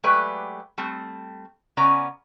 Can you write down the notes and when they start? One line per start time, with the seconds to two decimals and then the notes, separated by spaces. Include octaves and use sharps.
0.03 F#3 G#3 A3 G4 B4 D5
0.78 G3 A3 C4
1.77 C#3 B3 C#4 D5 A#5